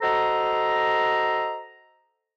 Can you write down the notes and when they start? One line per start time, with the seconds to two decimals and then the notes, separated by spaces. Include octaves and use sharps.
0.02 F#4 A4 C5 D#5 A#5